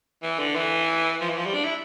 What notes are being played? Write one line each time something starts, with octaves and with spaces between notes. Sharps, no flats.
E3
D3
E3
F3
E3
F3
G3
D4
E4